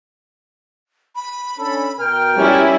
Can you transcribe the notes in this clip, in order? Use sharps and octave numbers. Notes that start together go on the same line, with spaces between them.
B5
C#4 D4 A4
B2 A#4 G5 F6
G3 C#4 E4